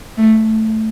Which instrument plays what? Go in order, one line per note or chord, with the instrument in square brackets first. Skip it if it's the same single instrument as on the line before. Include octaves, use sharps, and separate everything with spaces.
[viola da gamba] A3